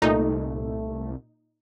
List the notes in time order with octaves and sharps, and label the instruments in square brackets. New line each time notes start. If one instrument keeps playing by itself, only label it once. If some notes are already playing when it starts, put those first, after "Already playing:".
[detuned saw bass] C2 [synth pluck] A#2 D#4 [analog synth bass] A3